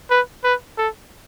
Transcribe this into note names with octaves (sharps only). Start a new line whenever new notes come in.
B4
B4
A4